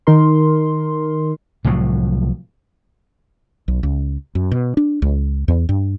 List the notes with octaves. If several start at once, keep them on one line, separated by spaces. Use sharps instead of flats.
D#3 D#4 A#4 C6
C2 A2 F3 F#3
B1
C#2
F#2
B2
D4
C#2
E2
G2